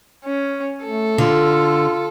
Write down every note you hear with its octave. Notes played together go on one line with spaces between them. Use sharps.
C#4
A3 A4
D3 F4